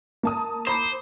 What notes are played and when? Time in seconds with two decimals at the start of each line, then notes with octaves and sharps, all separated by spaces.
0.23 A#3 A5 D#6
0.67 C5 A#5 B5 D6